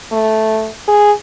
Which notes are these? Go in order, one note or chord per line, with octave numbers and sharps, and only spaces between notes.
A3
G#4